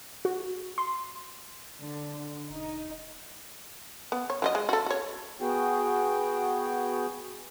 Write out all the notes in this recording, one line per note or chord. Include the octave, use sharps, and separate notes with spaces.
F#4
C6
D3
E1 D#4
B3
C#5
F#3 G4 D#5
G#3
F#4 A4
F#4 C#5
B3 F#4 G#4 G5